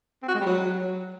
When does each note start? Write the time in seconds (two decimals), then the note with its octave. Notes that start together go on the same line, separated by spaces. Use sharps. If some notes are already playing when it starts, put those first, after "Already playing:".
0.22 C4
0.28 F#4
0.34 G#3
0.40 G3
0.46 F#3